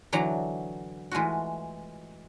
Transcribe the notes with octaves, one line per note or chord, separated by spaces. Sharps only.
D3 E3 F#3 D5 A#5
E3 G#3 A3 F4 F#4